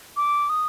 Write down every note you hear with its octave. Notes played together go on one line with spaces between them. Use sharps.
D6
D#6